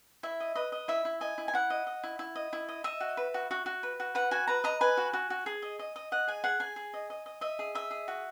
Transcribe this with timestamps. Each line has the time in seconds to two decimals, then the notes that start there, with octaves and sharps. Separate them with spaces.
0.23 E4 E5
0.40 D#5
0.55 B4 D#5
0.72 D#5
0.88 E4 E5
1.05 E4
1.21 D#5 G#5
1.38 E4
1.48 G#5
1.53 E4 F#5
1.70 D#5
1.87 D#5
2.03 E4
2.19 E4
2.35 D#5
2.53 E4
2.68 D#5
2.84 D#5 E5
3.00 F#4
3.17 B4
3.34 F#4
3.51 F#4
3.66 F#4
3.83 B4
4.00 F#4
4.15 B4 F#5
4.31 F#4 G#5
4.47 B4 A#5
4.64 D#5 A#5
4.81 B4 G#5
4.97 F#4
5.13 F#4
5.30 F#4
5.46 G#4
5.62 D#5
5.79 D#5
5.96 D#5
6.12 D#5 F#5
6.27 G#4 G#5
6.44 G#4 F#5
6.60 G#4 G#5
6.76 G#4
6.94 D#5
7.10 D#5
7.26 D#5
7.41 D#5 E5
7.59 G#4
7.75 D#5 E5
7.91 G#4
8.08 F#4